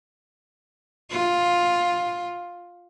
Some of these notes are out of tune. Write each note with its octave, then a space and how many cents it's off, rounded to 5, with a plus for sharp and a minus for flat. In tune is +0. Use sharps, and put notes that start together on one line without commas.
F4 +10